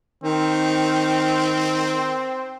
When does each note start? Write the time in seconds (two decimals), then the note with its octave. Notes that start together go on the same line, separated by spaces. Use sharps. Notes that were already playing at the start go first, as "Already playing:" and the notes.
0.24 D#3 C4